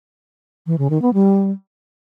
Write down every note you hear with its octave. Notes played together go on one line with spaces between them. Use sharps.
E3
C#3
D#3
B3
G3